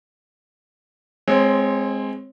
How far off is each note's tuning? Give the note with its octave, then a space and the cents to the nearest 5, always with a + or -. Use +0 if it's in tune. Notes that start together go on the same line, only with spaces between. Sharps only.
G#3 +0 C4 +0 C#5 -30